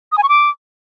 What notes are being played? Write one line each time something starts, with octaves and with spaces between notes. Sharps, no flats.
D#6
G#5
C#6
D6